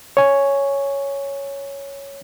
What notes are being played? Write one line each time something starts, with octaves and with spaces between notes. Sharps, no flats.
C#5 G#5